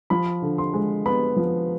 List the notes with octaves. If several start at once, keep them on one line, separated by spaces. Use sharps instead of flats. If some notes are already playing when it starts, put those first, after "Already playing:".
F3 B5
D3
C6
G#3
B3 B5
F3